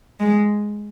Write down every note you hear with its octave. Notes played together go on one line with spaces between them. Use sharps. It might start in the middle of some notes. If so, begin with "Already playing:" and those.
G#3